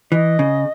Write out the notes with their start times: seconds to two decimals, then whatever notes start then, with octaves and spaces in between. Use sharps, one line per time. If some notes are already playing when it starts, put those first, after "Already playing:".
0.12 E3 D#5
0.39 C#3